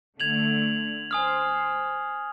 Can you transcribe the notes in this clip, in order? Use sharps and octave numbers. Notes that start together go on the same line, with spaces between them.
D3 A3 G#6 F7 F#7
C5 G#5 D#6 F6